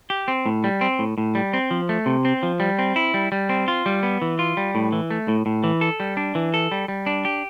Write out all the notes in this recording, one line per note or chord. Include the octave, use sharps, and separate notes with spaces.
G4
C4
A2
G3
C4
A2
A2
G3
C4
F3
A3
C3
C4
F3
G3
C4
E4
G3
G3
C4
F4
G3
B3
E3
F4
G3
A2
E3
A3
A2
A2
E3
A4
G3
D4
E3
A4
G3
G3
D4
G4